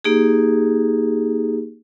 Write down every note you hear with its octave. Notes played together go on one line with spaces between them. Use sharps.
A#3 D#4 G4 G#4